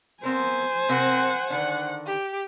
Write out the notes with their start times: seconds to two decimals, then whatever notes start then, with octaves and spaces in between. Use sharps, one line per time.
0.23 B3 C4 A#4 C5 G#5
0.89 C3 C4 A#4 F#5
1.50 D3 D#3 D4 F#5
2.06 G4